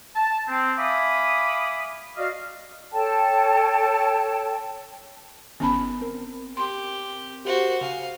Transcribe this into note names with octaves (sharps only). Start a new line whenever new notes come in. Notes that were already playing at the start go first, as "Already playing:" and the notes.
A5
C4
E5 F5 G#5 B5 D6 D#6
F#4 D5 D#5 F5
A4 C#5 G5 A5
G1 D#3 B3 C#4 B5
C4 A#4
G4 C6
F#4 G4 A#4 C5
C#3 F5 G#5 D#7